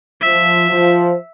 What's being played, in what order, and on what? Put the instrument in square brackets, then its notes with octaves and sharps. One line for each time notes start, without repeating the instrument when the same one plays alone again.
[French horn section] F3 [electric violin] E5
[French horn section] F3